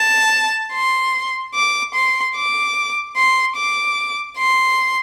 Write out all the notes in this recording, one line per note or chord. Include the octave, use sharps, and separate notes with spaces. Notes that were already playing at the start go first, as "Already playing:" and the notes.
Already playing: A5
C6
D6
C6
D6
C6
D6
C6